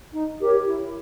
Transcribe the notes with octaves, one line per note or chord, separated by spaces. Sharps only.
D#4
G4 A#4 C#5
E4